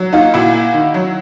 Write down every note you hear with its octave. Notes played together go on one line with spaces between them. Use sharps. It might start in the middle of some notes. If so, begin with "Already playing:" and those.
Already playing: F#3
A#3 D#4 F4
A#2 E4 F#4
A#3
D#3
F#3